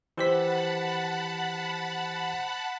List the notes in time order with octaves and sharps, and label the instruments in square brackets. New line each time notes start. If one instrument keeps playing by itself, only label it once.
[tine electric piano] E3 G4 B6 [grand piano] C5 [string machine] F#5 A5 B5